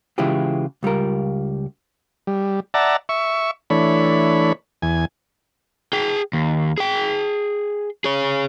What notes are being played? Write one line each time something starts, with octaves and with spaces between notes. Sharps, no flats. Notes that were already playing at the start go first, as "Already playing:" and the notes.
C#3 E3 G#3 E4 F4 G4
C#2 G3 F4 A#4
G3
D5 E5 F#5 A5 A#5
E5 C#6
E3 A3 D4 C#5 B5
E2 G#5
G#4 G5
D#2
G#4 G5
G#4 C#5